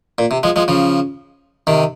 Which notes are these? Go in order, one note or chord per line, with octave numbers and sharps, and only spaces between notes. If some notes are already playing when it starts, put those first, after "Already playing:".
A#2
C3
F3 G#3
F3 G#3
C#3 F3
C3 D#3